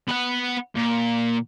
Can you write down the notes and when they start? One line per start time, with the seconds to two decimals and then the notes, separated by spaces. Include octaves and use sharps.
0.08 B3 F#5
0.75 A#2